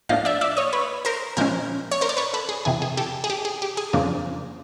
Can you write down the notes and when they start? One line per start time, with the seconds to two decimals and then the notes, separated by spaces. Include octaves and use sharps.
0.09 A2 F3 A#3 D4 D#5 F5
0.25 D5 E5
0.41 D5 E5
0.57 C#5 D#5
0.73 B4 C#5
1.05 A#4 C5
1.37 A#2 F3 G#3 C#4 A#4 C5
1.91 C#5
2.01 A#4 C5
2.09 D5
2.17 B4 C#5
2.34 A4 B4
2.49 G#4
2.65 F2 C3 E3 G#4
2.82 G#4
2.97 G4 A4
3.24 G#4
3.30 G4
3.45 G#4
3.62 G4
3.77 G#4
3.93 F2 C#3 F3 A#3 D4